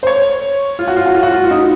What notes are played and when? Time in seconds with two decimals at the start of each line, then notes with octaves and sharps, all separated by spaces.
0.03 C5
0.07 C#5
0.79 F4
0.88 F#4
0.97 F4
1.06 F#4
1.15 F4
1.23 F#4
1.32 F4
1.44 F4
1.51 D#4